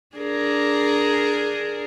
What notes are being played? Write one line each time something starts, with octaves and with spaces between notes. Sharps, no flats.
D4 G#4 A#4